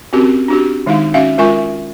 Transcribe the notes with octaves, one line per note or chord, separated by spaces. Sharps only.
C4 C#4 F#4 G4 A#4
D4 F#4 G4
D#3 G#3 D#4 E4 F5
C#4 F#4 E5 F5
G#3 F4 A#4 E5 G#5 C#6